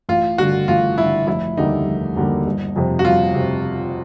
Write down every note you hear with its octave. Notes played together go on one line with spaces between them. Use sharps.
A1 F4
G2 D3 F#4
A1 F4
G2 D3 E4
F1 E4
D#2 D3 G3 A#3 D#4
F1
D#2 D3 G3 A#3
G1
F2 C3
F#4
G1 F4
C3